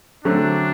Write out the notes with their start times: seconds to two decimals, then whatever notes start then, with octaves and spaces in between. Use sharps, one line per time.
0.24 D3 F#3 A3 C4 D4